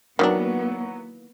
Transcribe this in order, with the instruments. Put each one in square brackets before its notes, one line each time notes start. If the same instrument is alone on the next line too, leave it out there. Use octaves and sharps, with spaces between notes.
[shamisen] D#3 E3 D4 [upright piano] F#3 F#4 [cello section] A#3 B3